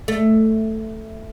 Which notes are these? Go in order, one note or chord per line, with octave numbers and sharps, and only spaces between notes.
A3